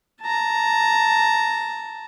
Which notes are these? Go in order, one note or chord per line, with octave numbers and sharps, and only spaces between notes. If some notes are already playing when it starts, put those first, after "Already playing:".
A5 A#5